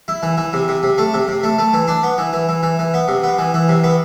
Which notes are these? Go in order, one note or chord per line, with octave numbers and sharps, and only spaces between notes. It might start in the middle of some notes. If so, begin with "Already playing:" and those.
E4
E3
E3
C3
C3
C3
A3
C3
C3
A3
A3
E3
D4
B3
E3
E3
E3
E3
E3
B3
C3
B3
E3
E3
C3
B3